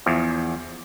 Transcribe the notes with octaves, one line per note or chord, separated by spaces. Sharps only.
E2 F3